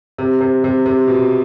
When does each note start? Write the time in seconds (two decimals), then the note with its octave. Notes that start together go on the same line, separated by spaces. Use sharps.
0.18 C3
0.41 C3
0.64 C3
0.86 C3
1.07 B2